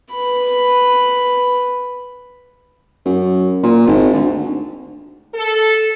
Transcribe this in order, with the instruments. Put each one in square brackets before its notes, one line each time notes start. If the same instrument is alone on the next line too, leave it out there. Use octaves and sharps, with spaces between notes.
[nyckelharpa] B4 B5
[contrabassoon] F#2
A#2
G#1
D2
[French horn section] A4